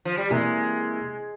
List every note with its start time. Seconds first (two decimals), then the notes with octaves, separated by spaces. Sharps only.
0.05 F3
0.17 G3
0.30 C3 E3 G#3 A#3 E4